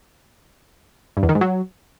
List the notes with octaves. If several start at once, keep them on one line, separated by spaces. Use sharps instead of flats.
G2
E2
D#3
G#2
F#3